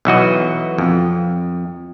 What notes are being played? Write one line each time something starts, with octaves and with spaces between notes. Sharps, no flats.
B1 E3 F#4 D#5
F2